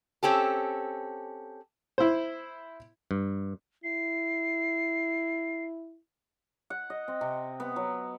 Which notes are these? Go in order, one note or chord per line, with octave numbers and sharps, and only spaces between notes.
C4 C#4 G4 A4
E4 C5
G2
E4 C7
F#5
D#5
C4
C3
B3
F#3